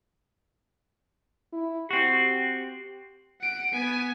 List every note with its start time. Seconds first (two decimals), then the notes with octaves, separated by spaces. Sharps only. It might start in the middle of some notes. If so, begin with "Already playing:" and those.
1.53 E4
1.91 C4 F#4 G4
3.41 F#5 D7
3.71 B3 G#5